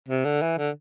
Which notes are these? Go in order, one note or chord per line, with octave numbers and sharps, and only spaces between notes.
C3
D3
E3
D3